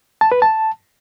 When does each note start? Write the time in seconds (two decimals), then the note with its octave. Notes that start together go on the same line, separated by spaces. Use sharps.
0.21 A5
0.32 B4
0.42 A5